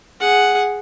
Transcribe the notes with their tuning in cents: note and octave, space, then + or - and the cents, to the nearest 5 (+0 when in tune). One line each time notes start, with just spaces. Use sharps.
G#4 +0 F#5 +0